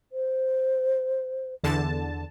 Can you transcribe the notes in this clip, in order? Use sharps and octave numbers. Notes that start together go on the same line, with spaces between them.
C5
E2 D3 A5